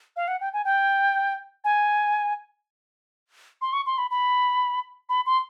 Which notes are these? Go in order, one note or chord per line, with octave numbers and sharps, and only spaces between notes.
F5
F#5
G5
G#5
G5
G#5
C6
C#6
C6
B5
B5
B5
C6